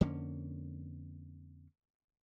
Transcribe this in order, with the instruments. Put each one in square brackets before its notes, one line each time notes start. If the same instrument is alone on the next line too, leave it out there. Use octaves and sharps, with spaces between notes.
[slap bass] F2 D3 A#3 C#4